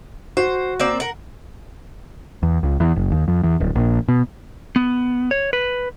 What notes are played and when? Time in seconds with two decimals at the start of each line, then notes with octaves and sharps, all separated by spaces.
0.37 F#4 C5
0.79 A#3 C4 D5
1.00 A#4 F#5
2.43 E2
2.63 C#2
2.80 E2
2.96 F#1
3.12 D#2
3.28 F2
3.43 E2
3.60 D1
3.75 A#1
4.08 B2
4.76 B3
5.31 C#5
5.53 B4